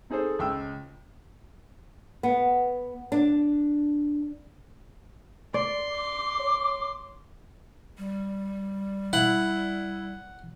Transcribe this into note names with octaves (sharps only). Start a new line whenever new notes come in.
C4 D#4 G#4 A4 C5
C#2 G5 E6
B3
D4
D5 C6
D6
C#5
G3
E4 F#5